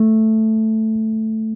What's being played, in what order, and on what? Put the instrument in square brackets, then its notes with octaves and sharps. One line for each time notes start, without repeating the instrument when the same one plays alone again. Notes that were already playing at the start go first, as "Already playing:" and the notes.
Already playing: [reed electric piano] A3